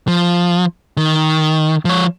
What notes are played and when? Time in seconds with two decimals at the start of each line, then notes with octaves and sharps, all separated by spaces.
0.08 F3
0.97 D#3
1.85 F3 C#5